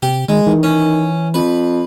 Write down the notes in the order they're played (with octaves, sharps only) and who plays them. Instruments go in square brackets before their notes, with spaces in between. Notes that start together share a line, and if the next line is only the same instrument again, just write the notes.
[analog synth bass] C3 [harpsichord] G4
[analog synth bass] D#3 [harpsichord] G#3
[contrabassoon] D#3 [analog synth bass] E3
[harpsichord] C#4
[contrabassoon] F2 [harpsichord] B4